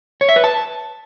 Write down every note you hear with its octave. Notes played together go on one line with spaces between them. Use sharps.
C#5
E5
B4
A5